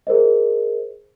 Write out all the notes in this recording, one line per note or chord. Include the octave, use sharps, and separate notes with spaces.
G#4 A#4 C5 D#5